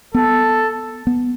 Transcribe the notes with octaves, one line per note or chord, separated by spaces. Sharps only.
B3 A4
B3